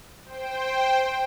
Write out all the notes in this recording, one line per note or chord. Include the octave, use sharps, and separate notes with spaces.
C5 G5